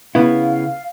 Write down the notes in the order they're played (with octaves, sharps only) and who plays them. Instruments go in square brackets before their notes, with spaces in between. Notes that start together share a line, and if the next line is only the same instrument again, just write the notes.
[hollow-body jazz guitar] C#3 B3 E4 [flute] F5